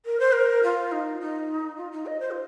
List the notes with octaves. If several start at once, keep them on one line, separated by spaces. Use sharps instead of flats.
A#4
C5
A#4
F4
D#4
D#4
F4
D#4
D#5
C5
F4